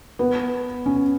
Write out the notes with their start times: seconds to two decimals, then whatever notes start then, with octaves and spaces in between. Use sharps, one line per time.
0.19 B3
0.86 C#4